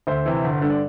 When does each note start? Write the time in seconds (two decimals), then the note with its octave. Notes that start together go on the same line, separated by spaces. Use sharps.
0.07 D2 C5 E5
0.26 C3 E3
0.44 G1
0.61 G2 D3
0.70 D5